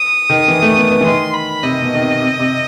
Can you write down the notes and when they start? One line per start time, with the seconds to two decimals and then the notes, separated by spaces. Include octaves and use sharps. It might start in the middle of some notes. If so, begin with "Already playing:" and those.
Already playing: D#6
0.30 D#3
0.48 E3
0.62 A3
0.77 B3
0.92 B3
1.01 E3
1.06 D#3 C6
1.34 B5
1.63 C3 D#5
1.82 B2
1.95 D#3
2.01 C3
2.21 C3
2.39 C3